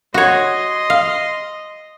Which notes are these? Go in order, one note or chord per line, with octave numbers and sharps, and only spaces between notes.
F#4 C#5 D#5 C6
F5